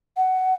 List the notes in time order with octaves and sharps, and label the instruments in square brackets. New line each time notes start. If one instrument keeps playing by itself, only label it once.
[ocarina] F#5